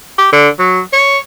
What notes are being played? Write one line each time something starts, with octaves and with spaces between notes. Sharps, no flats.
G4
D3
F#3
C#5